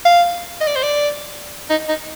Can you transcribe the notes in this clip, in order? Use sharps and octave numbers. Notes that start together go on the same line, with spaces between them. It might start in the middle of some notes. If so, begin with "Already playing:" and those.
F5
D#5
D5
C5
D5
D#4
D#4